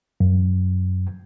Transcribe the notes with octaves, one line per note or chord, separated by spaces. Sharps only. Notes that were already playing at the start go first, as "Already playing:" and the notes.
F#2